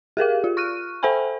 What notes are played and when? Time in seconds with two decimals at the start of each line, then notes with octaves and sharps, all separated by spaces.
0.17 G4 G#4 A#4 F5
0.44 F4
0.57 C#6 F6 F#6 D#7
1.03 A4 C5 E5 G5 G#5 B5